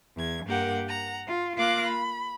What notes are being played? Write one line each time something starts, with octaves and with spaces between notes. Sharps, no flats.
E2 G#6
G2 A#3 G4 A#4 F#5
F#5 A#5
F4
A#3 F4 F5 D6 F#6 A#6
B5